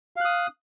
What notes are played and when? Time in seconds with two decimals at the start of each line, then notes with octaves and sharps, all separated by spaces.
0.16 F5
0.21 F#6
0.25 D#6